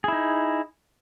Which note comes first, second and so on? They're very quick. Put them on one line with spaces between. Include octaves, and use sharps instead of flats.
G#4 E4 D#4